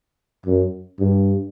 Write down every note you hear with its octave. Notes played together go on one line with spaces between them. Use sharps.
F#2
G2